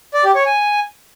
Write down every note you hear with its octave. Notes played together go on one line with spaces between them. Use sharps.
D5
G4
C#5
G#5